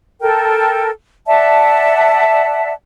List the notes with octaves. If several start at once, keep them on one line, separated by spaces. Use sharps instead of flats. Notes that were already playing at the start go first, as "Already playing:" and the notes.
A4 A#4 G5
D5 E5 F#5 A5